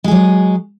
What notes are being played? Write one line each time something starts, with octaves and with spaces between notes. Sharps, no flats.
F#3 G#3 G#4